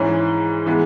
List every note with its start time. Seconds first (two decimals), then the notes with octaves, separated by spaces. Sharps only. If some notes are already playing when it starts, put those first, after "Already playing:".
Already playing: G#2 E3 C#4
0.66 E3 G#3 B3